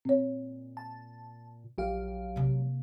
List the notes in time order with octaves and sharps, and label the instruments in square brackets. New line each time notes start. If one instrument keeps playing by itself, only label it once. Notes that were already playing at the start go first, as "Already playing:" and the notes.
[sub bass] A#2 [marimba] C4 C#5
[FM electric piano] A5
[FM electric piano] A#1 G4 F5 [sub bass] F#3
[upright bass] C3 A#3